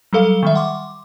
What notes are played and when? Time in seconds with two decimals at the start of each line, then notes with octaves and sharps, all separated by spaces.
0.13 F#3 G3 A4 F5
0.43 D#3 G3 E5
0.55 F#5 C6 D6